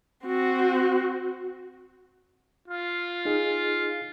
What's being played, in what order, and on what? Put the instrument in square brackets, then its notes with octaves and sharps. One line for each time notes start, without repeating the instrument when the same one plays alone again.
[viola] C4 F#4
[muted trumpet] F4
[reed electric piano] D#4 G#4